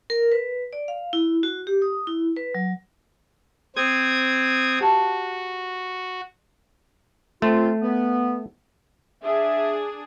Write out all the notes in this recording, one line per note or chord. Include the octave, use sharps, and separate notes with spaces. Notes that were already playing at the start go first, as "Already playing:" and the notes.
A#4
B4
D5
F5
E4
F#4
G4
D#6
E4
B4
F#3
C4 C5 D#6 G#6
F#4 G4 A5
A3 C4 F4
B3
D4 G#4 E5